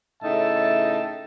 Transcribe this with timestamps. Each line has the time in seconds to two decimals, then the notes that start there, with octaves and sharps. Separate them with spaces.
0.23 A2 C#3 D#4 E5 A5